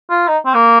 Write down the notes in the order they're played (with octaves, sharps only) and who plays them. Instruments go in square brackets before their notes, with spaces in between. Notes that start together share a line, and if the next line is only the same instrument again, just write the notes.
[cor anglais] F4
D#4
C4
A#3